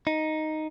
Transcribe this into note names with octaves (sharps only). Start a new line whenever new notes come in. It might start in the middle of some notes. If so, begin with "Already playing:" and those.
D#4